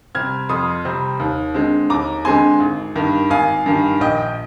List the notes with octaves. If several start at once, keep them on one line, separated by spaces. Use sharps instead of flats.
C3 G3 C4 F6 G#6
F2 C6 D#6
C3 G3 C4
D#2
D3 G#3 C4
D#2 A#5 D6
D3 G#3 C4 G#5 C6
G#1
G2 D#3
G#1 F5 G#5
G2 D#3
A#1 D#5 G5